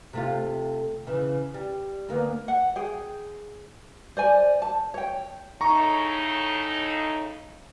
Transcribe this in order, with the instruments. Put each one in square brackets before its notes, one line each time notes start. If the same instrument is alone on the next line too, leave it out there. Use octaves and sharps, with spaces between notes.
[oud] C3 A3 F4
C#3 E3
G3
D2 A#3 B3
[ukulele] F#5
G#4 G5
C5 D5 G#5
A5
C#5 G5
[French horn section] A2 C#3 D#4 [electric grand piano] A#5 C#6